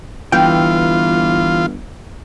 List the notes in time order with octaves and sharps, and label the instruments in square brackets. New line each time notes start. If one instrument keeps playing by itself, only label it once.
[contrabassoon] G1 [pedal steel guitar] E3 [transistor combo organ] F4 [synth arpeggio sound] G5